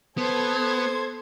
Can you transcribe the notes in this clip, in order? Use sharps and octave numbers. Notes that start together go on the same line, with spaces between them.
B3 A4 C5 G#6